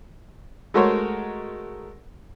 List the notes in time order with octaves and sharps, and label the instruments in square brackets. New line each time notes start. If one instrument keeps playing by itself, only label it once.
[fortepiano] G#3 A3 F#4 A#4 C5 C#5